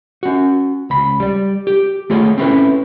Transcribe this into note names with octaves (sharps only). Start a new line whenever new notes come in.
C#4 F#4
C#2 B5
G3 D5
G4
A3 F4 G#4 C#5 D#5
C4 C#4 E4 G#4 A4 B4